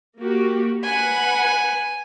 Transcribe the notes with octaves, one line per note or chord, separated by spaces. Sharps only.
A#3 F#4 G4
B4 F#5 G#5 B5